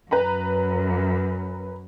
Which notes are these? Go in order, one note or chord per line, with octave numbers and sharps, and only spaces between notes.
F#2 B4 A#5 B5